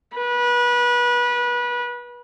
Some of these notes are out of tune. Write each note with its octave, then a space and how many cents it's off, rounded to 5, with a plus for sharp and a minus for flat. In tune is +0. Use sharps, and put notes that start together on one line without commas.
B4 -25